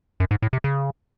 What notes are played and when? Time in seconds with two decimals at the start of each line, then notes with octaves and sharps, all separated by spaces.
0.20 F#2
0.31 G#2
0.42 A2
0.53 C3
0.64 C#3